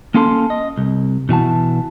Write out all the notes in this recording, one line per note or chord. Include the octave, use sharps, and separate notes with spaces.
A#3 C#4 F4 A4 A5 C6
D#5
C2
B2 E3 F#4 A5